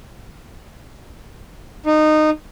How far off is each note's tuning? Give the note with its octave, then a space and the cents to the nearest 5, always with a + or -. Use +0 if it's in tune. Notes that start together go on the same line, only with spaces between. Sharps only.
D#4 -20